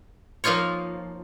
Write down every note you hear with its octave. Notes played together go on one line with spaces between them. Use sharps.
F3 A#3 D#4 F4 C#5